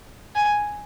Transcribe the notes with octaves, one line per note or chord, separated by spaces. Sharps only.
G#5